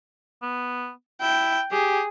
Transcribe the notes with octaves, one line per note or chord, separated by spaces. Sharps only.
B3
E4 G5
G4 G#4